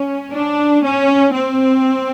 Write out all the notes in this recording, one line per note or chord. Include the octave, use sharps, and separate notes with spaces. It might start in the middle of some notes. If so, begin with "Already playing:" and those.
Already playing: C#4
D4
C#4
C4